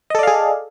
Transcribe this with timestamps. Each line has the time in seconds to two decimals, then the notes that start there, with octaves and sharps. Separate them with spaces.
0.10 D#5
0.15 A4
0.19 D5
0.23 F5
0.27 G#4